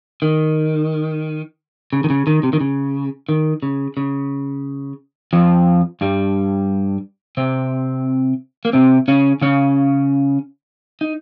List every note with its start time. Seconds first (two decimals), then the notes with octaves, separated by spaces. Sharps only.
0.22 D#3
1.93 C#3
2.04 D#3
2.10 C#3
2.27 D#3
2.43 C3
2.53 D#3
2.61 C#3
3.29 D#3
3.63 C#3
3.97 C#3
5.33 F2 F3
6.01 G2 G3
7.37 C3 C4
8.65 A#3
8.73 C3 C4
9.08 C#3 C#4
9.42 C#3 C#4
11.01 D#4